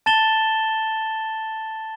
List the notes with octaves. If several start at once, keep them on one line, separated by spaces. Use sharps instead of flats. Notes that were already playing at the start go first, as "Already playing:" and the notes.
A5 A6 E7 G7